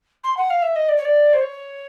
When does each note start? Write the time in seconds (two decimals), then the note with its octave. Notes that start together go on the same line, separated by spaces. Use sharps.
0.23 C6
0.36 F#5
0.50 F5
0.62 E5
0.75 D#5
0.88 D5
0.97 C#5
1.04 D5
1.33 C5
1.40 C#5